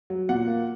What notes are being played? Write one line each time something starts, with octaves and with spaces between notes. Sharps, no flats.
F#3
A#2 F#5
A#3